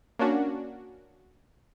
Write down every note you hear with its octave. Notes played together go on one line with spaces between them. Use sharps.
A#3 C#4 D4 F#4